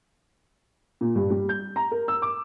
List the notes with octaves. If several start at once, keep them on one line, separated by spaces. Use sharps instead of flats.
A#2
G2
G3
G6
A#5
A#4
E6
D6